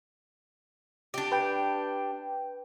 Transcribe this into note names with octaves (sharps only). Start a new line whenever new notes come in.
D4 G4
B4 G5